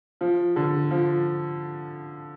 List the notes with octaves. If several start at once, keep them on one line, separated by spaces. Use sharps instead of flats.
F3
D3
F3